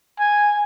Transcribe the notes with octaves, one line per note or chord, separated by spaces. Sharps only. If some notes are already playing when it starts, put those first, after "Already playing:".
G#5